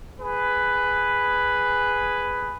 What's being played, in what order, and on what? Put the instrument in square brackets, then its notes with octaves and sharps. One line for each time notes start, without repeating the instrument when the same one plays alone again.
[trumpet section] G#4 B4